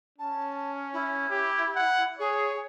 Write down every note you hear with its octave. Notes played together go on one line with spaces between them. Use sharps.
C#4 A5
E4
G4
F#5
G#4 C#5